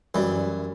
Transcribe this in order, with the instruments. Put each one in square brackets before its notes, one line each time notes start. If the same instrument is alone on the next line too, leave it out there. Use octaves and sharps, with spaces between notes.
[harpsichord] F#2 E3 G3